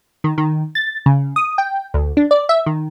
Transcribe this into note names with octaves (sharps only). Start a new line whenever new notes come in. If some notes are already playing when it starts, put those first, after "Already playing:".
D#3
D#3
A6
C#3
D#6
G5
D2
D4
D5
E5
D#3